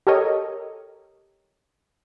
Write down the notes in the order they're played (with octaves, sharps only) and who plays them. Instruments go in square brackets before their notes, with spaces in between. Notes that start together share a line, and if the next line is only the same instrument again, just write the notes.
[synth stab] G4 A4 A#4 C#5 D#5